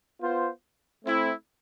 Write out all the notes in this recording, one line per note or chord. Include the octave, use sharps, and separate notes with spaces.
B3 F4 C5
A3 C4 E4